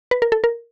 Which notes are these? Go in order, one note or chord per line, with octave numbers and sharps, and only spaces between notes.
B4
A#4
A4
A#4